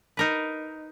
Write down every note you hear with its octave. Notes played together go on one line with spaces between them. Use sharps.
D#4 A#4 B4